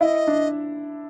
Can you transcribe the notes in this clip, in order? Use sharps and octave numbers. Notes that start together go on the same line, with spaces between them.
E4 D#5
D4